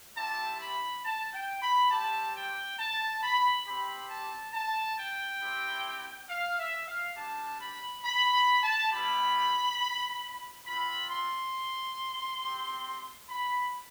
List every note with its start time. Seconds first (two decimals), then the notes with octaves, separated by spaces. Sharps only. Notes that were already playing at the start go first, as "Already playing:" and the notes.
0.16 G3 C4 E4 G4 A5
0.60 B5
1.04 A5
1.33 G5
1.62 B5
1.91 G3 C4 G4 A5
2.36 G5
2.80 A5
3.23 B5
3.66 C4 G4 B5
4.10 A5
4.54 A5
4.98 G5
5.41 C4 E4 G4
6.30 F5
6.59 E5
6.87 F5
7.16 G3 D4 G4 A5
7.60 B5
8.04 B5
8.33 B5
8.63 A5
8.92 G3 B3 E4 G4 B5
10.66 C4 F4 B5
11.10 C6
12.41 C4 G4
13.29 B5